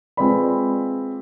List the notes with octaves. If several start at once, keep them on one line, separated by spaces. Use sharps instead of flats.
G#3 C4 F4 B4 D5 B5